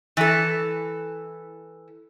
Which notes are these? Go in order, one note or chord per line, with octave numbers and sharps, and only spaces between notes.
E3 A4